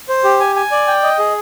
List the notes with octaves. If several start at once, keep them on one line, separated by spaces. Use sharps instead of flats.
C5
G4
G#5
G#5
D5
G5
D#5
G#4